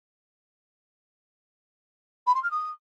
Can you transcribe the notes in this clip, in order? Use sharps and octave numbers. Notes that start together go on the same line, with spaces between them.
B5
C6
F6
D#6